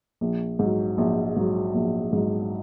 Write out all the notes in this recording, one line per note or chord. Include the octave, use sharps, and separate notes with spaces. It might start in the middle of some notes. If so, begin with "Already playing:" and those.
A#1
G#2 F#3
A#1
G#2 F#3
A#1
G#2 F#3